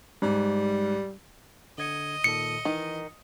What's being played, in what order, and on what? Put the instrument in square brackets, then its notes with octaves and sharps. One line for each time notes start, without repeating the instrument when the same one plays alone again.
[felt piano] G#2 [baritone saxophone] G3
[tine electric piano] D3 G#6 C#7 [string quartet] D#5
[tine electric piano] A#2 D#3 A4 [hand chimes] C#7
[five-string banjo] D#3 [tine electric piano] E3